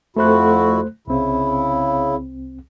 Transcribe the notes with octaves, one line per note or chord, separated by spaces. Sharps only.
F2 A3 E4 F#4 C5 F#6
C2 C#3 C4 E4